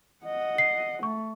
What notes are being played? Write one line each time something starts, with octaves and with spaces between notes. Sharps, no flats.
D#5 F#5
C7
A3 C#6